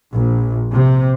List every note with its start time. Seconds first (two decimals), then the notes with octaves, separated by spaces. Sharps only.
0.13 A#1
0.73 C3